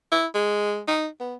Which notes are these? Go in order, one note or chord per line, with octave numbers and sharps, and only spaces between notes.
E4
G#3
D#4
B3